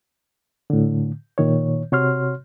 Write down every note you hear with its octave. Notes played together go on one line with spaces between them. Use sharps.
A2 D3
A#2 D#3 C#5
C3 F#4 C#5 C6 F6